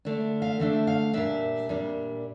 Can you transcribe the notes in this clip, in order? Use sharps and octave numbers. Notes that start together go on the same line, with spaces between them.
D3 A3 D4
F5
D3 A3 D4 E5
F5
A#2 G3 D4 E5
A#2 G3 D4